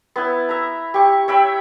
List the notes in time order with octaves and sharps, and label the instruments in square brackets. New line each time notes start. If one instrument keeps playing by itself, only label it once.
[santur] B3 E4
E5 A#5
G4 C#6
C#5 E5 G5 B5